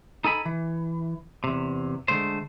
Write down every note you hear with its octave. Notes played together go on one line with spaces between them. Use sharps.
D#4 A4 G#5 B5
E3
E2 C3
D3 G#3 A3 C5